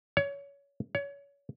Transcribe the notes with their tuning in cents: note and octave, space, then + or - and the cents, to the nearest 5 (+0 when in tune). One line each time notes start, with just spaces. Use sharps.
C#5 +20
C#5 +25